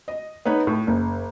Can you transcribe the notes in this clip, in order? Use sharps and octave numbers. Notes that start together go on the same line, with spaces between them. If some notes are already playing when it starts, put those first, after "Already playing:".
D#5
B3 D#4 B4 C#5
A2
F#1